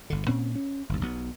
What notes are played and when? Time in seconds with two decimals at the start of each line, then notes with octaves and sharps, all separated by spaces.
0.10 G1 D3
0.28 A#2 C4 C#4
0.55 C#4
0.89 G1 D#2
1.01 B1 B3